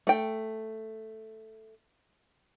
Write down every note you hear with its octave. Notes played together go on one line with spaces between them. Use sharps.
A3 G5